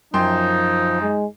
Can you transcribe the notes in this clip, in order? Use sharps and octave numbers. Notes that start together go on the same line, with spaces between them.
F#2 F3 D#4 G5 C6
G#3